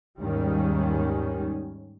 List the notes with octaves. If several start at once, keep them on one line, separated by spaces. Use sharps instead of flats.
D#2 G#2 D#3 G3 C#4